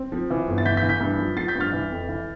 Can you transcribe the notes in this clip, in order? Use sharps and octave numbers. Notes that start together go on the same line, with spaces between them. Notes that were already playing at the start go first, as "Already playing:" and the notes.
Already playing: C4
F3
E3
G1
A6
E3 G6 B6
G6 B6
E3
G6 B6
G2
F3
F3 A6 C7
G6 B6
G2
F6 A6
E3
F2
E3